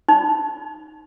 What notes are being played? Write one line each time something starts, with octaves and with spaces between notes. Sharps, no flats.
D#4